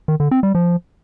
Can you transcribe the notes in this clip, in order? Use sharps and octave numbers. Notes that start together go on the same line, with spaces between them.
D#3
D3
C4
G3
F3